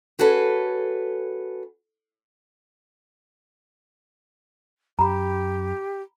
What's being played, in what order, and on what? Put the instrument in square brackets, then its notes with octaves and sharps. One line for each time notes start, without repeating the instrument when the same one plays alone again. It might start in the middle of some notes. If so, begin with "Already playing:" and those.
[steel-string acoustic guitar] C#4 F#4 G#4 A4 B4
[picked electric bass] F#2 [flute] G4 [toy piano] A#5 B5